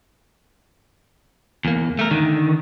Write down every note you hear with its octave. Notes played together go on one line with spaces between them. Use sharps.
E2 A#3
A3 A#4
D3 D#3